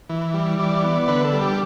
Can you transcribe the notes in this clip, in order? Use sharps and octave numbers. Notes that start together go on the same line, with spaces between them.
E3
G3
E3 D5
B3
D3 B4
A4
G3
G4